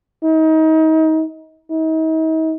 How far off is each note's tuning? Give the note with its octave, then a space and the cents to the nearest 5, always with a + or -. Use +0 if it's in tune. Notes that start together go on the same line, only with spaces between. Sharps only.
D#4 +30
D#4 +40